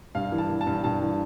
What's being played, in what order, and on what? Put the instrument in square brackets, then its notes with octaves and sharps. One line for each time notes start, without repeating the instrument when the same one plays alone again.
[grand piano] G2 F5
E3
A5
E3
A5
G2
G2 A5
E3